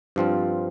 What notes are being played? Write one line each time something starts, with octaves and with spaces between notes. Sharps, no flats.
G2 F3 C4 F4